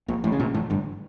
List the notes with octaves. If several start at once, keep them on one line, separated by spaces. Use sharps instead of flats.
A#1 A#2
A1 A2
C#3
A#1 A#2
A1 A2
G1 G2